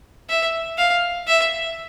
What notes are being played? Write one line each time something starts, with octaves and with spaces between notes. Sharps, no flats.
E5
F5
E5